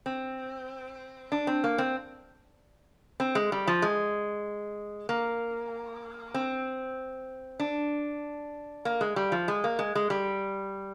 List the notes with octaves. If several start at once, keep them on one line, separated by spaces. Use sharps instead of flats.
C4
D4
C4
A#3
C4
C4
G#3
G3
F3
G#3
A#3
C4
D4
A#3
G#3
G3
F3
G#3
A#3
G#3
G#3
G3